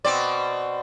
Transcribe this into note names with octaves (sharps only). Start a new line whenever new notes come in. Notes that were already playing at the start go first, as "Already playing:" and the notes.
B2 C4 D5